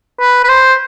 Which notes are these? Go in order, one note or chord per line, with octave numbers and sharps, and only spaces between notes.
B4
B4
C5